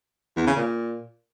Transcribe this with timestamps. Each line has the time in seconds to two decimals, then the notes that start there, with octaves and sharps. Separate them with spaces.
0.37 E2
0.47 C#3
0.57 A#2